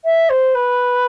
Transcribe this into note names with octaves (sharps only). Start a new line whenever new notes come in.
E5
C5
B4